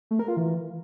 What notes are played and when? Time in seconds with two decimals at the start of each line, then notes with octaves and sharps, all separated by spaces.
0.11 A3
0.19 A#4
0.28 F4
0.37 E3